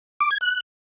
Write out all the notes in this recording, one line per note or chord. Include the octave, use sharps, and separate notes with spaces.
D6
G#6
F#6